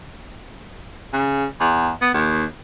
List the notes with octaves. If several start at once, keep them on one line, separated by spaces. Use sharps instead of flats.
C#3
E2
B3
D#2